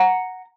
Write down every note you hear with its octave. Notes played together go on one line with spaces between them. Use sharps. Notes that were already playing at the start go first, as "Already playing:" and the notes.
Already playing: F#5 A#5